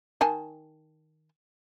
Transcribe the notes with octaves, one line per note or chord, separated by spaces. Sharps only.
D#3 G#5 A5